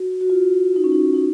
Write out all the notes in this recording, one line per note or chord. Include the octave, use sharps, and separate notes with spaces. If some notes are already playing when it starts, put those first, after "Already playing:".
Already playing: F#4
F#4
F4
D#4
C#4
D#4
D#4